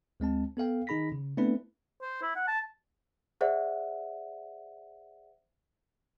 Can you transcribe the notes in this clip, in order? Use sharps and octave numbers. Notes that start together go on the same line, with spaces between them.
D2 G#3 C4 A5
B3 A4 F5 G5
D#3 D#4 G#4 B5 A#6 B6
C#3
A3 B3 C4 D4 E4 B4
C5
E4
F#5
A5
G#4 C5 D5 E5 F#5